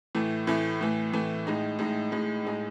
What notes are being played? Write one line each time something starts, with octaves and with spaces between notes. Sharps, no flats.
A2 E3 A3
A2 E3 A3
A2 E3 A3
A2 E3 A3
A2 G#3 D#4
A2 G#3 D#4
A2 G#3 D#4
A2 G#3 D#4